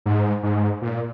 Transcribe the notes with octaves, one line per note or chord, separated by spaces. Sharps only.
G#2
G#2
A#2